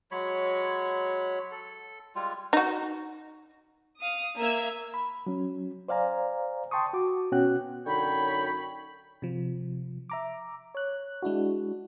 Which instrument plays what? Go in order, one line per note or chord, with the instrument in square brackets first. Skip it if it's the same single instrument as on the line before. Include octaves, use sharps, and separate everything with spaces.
[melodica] F#3 G#3 C#5 B5
A4
G3 G#3 F4
[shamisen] D#4 F#4
[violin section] F5 D#6
A#3 E5 E6 G#6
[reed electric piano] B5
F#3 C#4
C5 D5 F5 G#5 A#5
G5 A5 C6 C#6 D#6
F#4 D6
B2 B3 C#4 F#4 G5 F#6
[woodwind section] F#2 D3 D#4 C#5 G5 B5
[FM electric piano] C3 F3
E5 A#5 D6
C#5 F#6
G#3 D4 E4 F#4